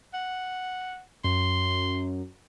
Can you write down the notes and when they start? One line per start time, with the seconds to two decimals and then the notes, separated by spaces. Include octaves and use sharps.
0.14 F#5
1.24 F#2 C6